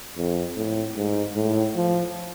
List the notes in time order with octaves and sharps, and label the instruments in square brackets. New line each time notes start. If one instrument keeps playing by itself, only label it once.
[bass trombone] F2
A2
G#2
A2
F3